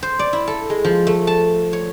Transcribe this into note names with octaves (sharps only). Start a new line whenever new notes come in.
C5
D5
E4
A4
G#3
F3
A3
A5
C#5